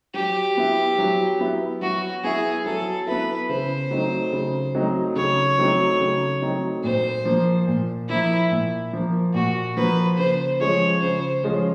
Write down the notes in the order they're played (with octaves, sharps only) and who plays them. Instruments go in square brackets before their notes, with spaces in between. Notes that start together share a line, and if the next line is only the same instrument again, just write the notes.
[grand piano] F#3 [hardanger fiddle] G4
[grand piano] B3 E4
F#3
B3 E4
[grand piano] F#3 [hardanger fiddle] F#4
[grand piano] B3 E4 [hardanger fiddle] G#4
[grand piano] F#3 [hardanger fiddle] A4
[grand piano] B3 E4 [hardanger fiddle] B4
[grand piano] C#3 [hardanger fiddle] C5
[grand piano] F#3 A3 C4 D#4
C#3
F#3 A3 C4 D#4
[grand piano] C#3 [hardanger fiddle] C#5
[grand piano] F#3 A3 C4 D#4
C#3
F#3 A3 C4 D#4
[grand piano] A#2 [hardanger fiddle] C5
[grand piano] F3 A#3
A#2
[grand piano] F3 A#3 [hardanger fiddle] E4
[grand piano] A#2
F3 A#3
[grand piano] A#2 [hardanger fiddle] F#4
[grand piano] F3 A#3 [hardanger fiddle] B4
[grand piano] C#3 [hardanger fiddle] C5
[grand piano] F3 G#3 C#4 F4 [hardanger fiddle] C#5
[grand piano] C#3 [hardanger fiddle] C5
[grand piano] F3 G#3 C#4 F4